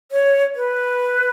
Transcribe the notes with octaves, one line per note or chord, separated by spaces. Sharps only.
C#5
B4